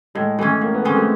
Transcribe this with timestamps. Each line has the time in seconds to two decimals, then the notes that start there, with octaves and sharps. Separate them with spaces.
0.15 A2 G#3
0.39 E3 G#3 A3 C#4
0.61 A2 A#3
0.74 B3
0.85 E3 G#3 C4 C#4
0.97 A3